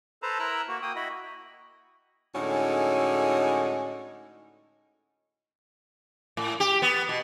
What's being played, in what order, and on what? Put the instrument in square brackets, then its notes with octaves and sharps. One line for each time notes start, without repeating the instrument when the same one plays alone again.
[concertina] A4 B4 C5 A5 A#5
E4 A#4 A#5 E6 F#6
A#3 F#4
A#3 G5 D#6
E4 F#4 D#5 B5
[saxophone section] A2 D3 G#3 C#4 D#4 F#4
[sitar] A2
G4
B3
B2